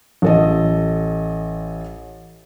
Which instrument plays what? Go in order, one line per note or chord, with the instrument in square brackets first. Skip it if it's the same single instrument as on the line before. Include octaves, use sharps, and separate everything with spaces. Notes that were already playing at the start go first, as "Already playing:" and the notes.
[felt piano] A1 A4 D#5